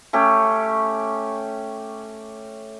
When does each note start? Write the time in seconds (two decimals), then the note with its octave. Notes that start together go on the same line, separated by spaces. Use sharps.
0.13 A3 C#4 G4